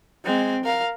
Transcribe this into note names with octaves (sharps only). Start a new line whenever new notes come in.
G#3 C4
A#4 F5